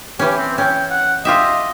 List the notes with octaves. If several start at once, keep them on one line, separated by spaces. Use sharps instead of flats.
E3 C#4 G4
C4
C#4 G5
F#5
F4 G4 D#5 E5